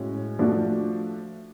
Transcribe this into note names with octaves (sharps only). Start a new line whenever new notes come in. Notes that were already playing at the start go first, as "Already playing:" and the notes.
Already playing: A2 G#3 C#4 F#4
F3 A3 D4 F#4